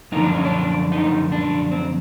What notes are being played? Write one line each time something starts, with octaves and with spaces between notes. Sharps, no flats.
F#2 D3 F3 D#4
D4
C#4
D4
D#4
D4
C4